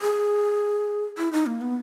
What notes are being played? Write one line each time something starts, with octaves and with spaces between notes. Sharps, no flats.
G#4
E4
D#4
A#3
B3